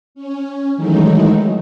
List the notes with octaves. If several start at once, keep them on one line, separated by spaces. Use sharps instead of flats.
C#4
D#3 E3 F#3 G#3 A3 D#4